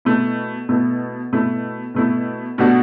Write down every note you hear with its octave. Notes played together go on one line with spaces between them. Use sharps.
B2 A3 E4
B2 A3 E4
B2 A3 E4
B2 A3 E4
B2 A3 D4 F#4